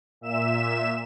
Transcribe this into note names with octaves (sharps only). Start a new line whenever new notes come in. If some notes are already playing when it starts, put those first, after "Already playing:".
A#2 E5 E7